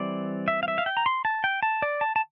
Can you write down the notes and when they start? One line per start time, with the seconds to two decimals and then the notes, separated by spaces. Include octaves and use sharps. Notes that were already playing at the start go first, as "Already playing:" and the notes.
Already playing: E3 G3 C4 D5
0.48 E5
0.63 F5
0.68 E5
0.78 F5
0.86 G5
0.97 A#5
1.06 C6
1.25 A5
1.44 G5
1.63 A5
1.82 D5
2.01 A5
2.16 A5